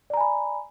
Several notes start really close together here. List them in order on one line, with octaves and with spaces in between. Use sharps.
D5 A#5 G#5 B5